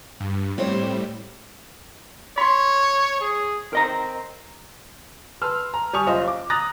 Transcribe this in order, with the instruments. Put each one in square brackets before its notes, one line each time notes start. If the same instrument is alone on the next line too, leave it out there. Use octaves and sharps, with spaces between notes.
[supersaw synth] G2
[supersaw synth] A2 G3 [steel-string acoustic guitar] C4 C5 C#5
[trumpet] C#5 [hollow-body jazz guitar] B5 C6
[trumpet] G#4
[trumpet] C4 [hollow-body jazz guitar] A#4 D#5 A#5
[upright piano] B4 A5 C6 E6 F6
A#5
G3 G#5 A5 C#6 D#6 F7
F#1 F4 C5 D#5
D6
A#5 D#6 F#6 A6 A#6